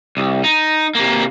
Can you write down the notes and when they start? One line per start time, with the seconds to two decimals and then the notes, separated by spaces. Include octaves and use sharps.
0.17 C2
0.44 D#4
0.95 C3 A#3